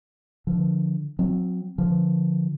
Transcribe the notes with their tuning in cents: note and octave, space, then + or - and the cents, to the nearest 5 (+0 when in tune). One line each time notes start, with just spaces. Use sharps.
D3 +10 F3 +0
F#3 -30 C4 +0
D3 +0 F3 +0